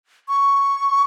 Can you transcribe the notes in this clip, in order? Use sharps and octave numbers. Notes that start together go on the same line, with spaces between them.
C#6